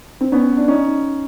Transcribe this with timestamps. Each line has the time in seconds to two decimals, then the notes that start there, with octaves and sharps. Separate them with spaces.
0.21 C4
0.32 B3 C#4
0.57 D4
0.68 C#4 D#4